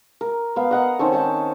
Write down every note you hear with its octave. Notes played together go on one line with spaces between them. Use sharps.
A#4
B3 F5
D#5 F#5 A#5
D#3 C4 C#4 A4
D#5 G5 A5